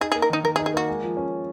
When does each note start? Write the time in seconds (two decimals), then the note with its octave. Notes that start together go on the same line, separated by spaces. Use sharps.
0.01 D#4 G#4
0.12 G#4
0.15 A#3
0.22 A#4
0.30 D#3 D#4
0.44 D#3 A#4
0.56 G#4
0.59 D#4
0.66 G#4
0.74 A#3 F#4
0.88 G#3
1.03 F3
1.17 C#4